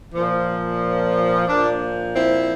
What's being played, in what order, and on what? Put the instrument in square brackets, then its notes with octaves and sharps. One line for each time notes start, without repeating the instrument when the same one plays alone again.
[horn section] A#2 F3
A#2 F3 A#3 D4
C4 E4